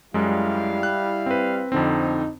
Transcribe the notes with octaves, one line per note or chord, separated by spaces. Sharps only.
F#2 G3 G#3 E4 F5
F#6
C4 B4
F2 D3 C4 D#4